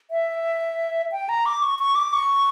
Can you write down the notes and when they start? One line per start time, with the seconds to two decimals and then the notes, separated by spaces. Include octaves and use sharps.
0.11 E5
1.12 G5
1.29 A#5
1.46 D6
1.62 C#6
1.79 C#6
1.95 D6
2.13 C#6